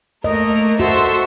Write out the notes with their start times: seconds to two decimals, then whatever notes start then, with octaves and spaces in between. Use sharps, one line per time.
0.24 A3 A#3 A#4 D#5
0.80 F#4 A4 C5 E5